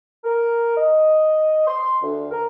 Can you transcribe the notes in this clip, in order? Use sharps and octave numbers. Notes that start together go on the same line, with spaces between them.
A#4
D#5
C6
D2
A#4